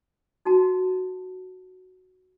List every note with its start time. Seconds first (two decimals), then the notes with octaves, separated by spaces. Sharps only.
0.45 D#4 F#4 A5